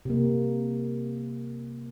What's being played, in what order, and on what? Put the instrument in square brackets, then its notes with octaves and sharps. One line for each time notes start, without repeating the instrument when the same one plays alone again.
[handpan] C3 A#3